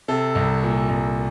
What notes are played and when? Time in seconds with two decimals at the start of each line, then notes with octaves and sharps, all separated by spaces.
0.08 C3 A4
0.35 C2
0.63 A#2
0.89 C2